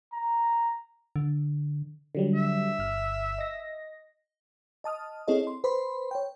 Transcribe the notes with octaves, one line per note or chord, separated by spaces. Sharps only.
A#5
D3
D3 F#3 G3
E5
G1 F6
D#5 A#6
D#5 A5 D#6 F6
C4 E4 G#4 A4 C#5 D#5
C6
B4 C5 B5 C6
C#5 G5